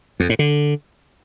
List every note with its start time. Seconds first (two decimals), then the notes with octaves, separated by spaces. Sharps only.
0.20 F2
0.29 A2
0.39 D3